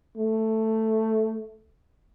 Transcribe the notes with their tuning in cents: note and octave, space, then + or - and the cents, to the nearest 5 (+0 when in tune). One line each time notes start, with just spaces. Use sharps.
A3 +5